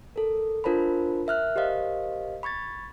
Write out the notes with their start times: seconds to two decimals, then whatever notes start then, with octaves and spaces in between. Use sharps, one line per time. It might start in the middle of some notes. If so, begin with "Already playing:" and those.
0.16 A4 A#4
0.64 D4 F4 A#4 C5 A5 B5
1.27 A#4 E5 F6 F#6
1.56 G4 A#4 C5 D#5 F5
2.43 B5 C#6 G#6 A6